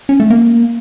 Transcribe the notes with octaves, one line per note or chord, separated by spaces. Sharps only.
C#4
A3
A#3